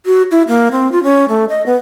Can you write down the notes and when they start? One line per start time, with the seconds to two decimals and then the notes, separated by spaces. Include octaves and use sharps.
0.06 F#4
0.31 E4
0.48 A#3
0.72 C4
0.92 F4
1.04 C#4
1.29 A3
1.49 D#5
1.66 B3